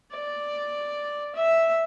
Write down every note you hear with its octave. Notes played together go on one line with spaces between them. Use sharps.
D5
E5